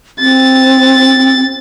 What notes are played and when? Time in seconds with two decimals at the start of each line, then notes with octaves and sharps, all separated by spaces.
0.19 C4 A6